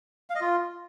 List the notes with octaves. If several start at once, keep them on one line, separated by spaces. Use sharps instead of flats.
F5
D#5
F4